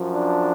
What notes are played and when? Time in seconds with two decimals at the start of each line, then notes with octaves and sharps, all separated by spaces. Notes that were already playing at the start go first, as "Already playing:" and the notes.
Already playing: F#2 F3
0.13 D4